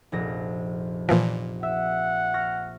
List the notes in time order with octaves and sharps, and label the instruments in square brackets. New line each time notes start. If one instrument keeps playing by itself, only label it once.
[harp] F1 A#1 A#6
[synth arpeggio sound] A#2 E3 F3
[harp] E5 [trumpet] F#5
[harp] C#6 F6 A#6